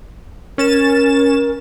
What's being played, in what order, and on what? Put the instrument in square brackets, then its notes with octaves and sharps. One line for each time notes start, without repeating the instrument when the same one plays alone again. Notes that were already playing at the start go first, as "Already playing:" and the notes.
[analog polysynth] C#4 A6 E7 [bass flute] A#4